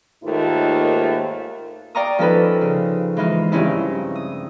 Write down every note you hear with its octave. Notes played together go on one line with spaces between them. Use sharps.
D#2 G#2 A3 A#3 D#4 F4
D5 F5 G5 A#5 C#6 D#6
F3 C#4 D#4 A4 B4
C#3
G#2 E3 D#4 F4
G2 C#3 C4 C#4 D#4 E4
D#6